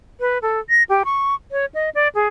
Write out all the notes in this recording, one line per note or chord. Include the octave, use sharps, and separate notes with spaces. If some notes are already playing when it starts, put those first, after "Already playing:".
B4
A4
A#6
G4
C#6
C#5
D#5
D5
G#4